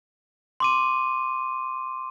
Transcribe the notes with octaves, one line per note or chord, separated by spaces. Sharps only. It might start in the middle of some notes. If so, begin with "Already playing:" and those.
C6 D6 D#7